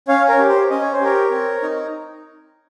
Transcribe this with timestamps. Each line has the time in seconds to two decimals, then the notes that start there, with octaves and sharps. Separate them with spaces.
0.08 C#4 C#5 F5
0.29 A#4 C#5
0.39 G4
0.49 C5
0.70 C#4 D#5
0.81 C#5
0.93 C5
1.00 G4 A#4 C#5
1.31 C4
1.62 D#4